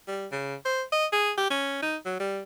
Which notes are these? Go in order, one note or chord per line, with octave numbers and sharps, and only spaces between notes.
G3
C#3
C5
D#5
G#4
G4
C#4
D#4
F#3
G3